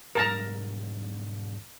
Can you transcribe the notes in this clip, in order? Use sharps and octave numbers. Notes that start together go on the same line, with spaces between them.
E1 G#2 G3 A#4 A5 A#5